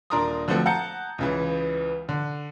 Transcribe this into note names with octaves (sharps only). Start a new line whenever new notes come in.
D#1 D4 A#4 A#5 C6 D#6
D3 F3 F#3 A3 C4 A4
F#5 A5 A#5 G6 C#7
C#2 C#3 E3
D3